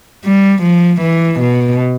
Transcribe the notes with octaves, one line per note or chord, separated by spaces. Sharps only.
G3
F3
E3
B2